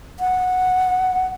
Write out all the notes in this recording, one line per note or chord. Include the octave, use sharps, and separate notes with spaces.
F#5